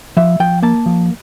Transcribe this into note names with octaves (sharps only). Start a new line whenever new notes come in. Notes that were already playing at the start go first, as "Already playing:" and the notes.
F3 E5
F3 G5
A#3 A5
F3